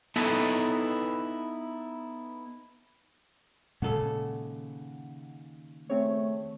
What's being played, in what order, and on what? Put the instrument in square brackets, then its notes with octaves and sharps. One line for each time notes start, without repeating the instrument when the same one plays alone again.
[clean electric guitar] B3 D#4 E4 A4 B4
[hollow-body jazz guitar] D#2 C#3 A4 [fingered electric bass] A#2 G#3 C#4 [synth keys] F#5
[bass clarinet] A3 [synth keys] C4 G#4 C#5